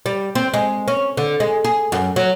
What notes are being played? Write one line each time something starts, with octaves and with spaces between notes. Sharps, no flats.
G3
C4
G#3
C#4
D3
G#3
G#4
F#2
F#3